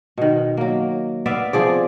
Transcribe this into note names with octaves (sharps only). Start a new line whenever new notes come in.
B2 D#3
F#3 A#3
B3 D5 E5 F5
C3 F3 G#4 D5